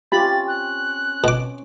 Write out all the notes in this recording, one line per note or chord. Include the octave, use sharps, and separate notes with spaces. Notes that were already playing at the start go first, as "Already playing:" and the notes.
C4 C#4 F4 G4 B5 A6
F#6
B2 D6